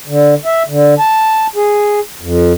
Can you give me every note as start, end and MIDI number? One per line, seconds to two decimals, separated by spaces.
0.08 0.34 50
0.45 0.63 76
0.68 0.94 50
0.99 1.47 81
1.56 2.00 68
2.21 2.53 41